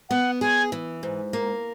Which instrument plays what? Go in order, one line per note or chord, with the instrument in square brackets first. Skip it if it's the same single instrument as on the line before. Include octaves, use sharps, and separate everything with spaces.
[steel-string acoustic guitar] B3 [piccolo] F#5
[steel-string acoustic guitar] G#4 [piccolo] G#5
[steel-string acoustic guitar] E3
G#2
A#3